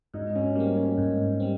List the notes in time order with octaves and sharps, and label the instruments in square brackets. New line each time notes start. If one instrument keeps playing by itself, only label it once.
[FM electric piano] G#2 [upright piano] D#4
[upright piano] C#4
[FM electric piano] G3 C4 [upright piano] A#3
[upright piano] C#4
[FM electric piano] G#2 [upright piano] D#4
[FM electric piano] G3 C4